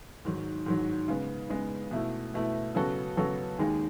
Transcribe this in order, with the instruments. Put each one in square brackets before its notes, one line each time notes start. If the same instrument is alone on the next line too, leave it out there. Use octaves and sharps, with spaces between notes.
[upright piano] G#2 D#3 F#3
G#2 D#3 F#3
C#3 G#3 B3
C#3 G#3 B3
B2 A3 E4
B2 A3 E4
C#3 F#3 B3 F#4 A4
C#3 F#3 B3 F#4 A4
D#2 D#3 G#3 D#4 G#4